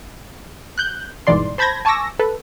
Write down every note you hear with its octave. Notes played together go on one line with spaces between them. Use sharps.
F#6 G6
G1 G#2 B2 E3 D5 C6
C5 A5 B5 G6 G#6 A#6
G#5 A5 C#6 D6 E6 A#6
A4 B4